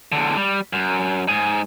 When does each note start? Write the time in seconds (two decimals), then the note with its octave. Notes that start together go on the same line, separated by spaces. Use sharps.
0.12 E2 D3
0.36 G3
0.73 F#2
1.29 G#2 G#4